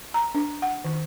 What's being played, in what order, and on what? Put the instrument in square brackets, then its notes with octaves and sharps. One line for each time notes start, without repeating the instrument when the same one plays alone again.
[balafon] A#5
D4
F#5
D#3